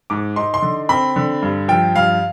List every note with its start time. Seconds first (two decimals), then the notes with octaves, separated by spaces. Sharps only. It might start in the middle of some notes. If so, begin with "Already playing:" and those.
0.10 G#2 D6
0.36 D#4 C6
0.54 C6
0.62 D3
0.89 C4 B5
1.16 D3
1.42 G2
1.68 F3 G5
1.95 G2 F5